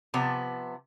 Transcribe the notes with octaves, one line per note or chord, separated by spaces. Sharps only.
C3 F3 B3